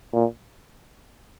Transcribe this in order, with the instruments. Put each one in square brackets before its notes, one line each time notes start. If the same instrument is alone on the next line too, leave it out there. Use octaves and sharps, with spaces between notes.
[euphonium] A#2